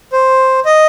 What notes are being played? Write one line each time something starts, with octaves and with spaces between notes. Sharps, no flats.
C5
D#5